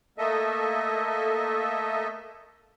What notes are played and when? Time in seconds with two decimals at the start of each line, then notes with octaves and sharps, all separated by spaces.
0.18 A3 A#3 A4 D#5 E5